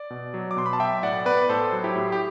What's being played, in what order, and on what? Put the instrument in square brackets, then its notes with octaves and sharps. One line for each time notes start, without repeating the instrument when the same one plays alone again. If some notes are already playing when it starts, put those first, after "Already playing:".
Already playing: [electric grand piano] D5
B2
F#3
D6
B2 C6
B5
A5
F#3 E5 G5
A2 D5 F#5
B3 B4 D5
A2 A4 C5
F#3
E4 G4
A2
G4